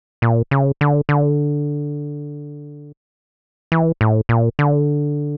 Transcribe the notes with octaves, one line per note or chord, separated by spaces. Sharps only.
A#2
C#3
D3
D3
E3
A2
A#2
D3